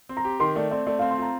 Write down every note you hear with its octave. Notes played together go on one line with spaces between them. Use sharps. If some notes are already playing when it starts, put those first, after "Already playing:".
C4
A#5
G4
D#3 C6
A3 D5
C4 D5
A3 D5
C4 F5
C6
F4 A#5